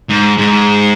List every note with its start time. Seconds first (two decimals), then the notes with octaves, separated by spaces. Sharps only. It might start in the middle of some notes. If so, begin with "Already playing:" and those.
0.09 G#2
0.37 G#2